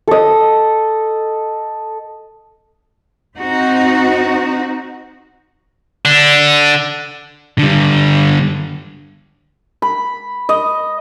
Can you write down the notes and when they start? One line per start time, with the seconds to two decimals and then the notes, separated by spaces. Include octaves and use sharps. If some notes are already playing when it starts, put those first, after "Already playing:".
0.08 A4 D#5
3.37 C4 D#4 F#4
6.05 D3 D4
7.58 D3 G3
9.82 B5
10.49 D#5